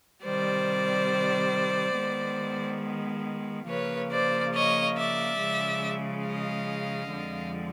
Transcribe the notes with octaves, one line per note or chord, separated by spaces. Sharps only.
C3 D#3 G3 C5 D5
D#3 G#3 B3
C#3 F3 A#3 B4 C#5
C5 D5
C#5 D#5
D5 E5
C#3 F3 G#3
D#5 F5
F2 D3 F3 G#3 C4